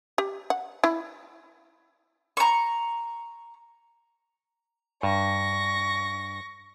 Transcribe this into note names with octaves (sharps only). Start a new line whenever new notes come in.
G4
F#5
E4
A#5 C#6
G2 C#6 A#6